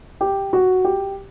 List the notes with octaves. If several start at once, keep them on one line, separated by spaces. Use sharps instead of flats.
G4
F#4
G4